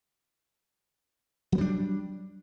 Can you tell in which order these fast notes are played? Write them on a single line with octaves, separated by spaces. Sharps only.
F#3 B3 G3 D4